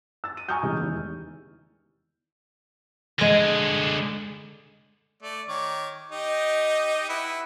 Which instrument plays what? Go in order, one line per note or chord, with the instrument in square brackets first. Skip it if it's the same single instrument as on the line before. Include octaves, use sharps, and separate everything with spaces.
[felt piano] E6 A6
D#7
G#5 A#5 C#6 D#6 F6 G6
C#3 E3 G3 G#3
E2 D#3
[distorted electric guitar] D3 G#4 [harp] G#3 A#6
[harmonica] A3 D5
D#3 C#5 D6
D#4 G4 D#5
E4 B4 F#5